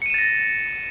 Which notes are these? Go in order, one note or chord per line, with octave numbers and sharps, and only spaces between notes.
A6 A#6 C#7 D#7 E7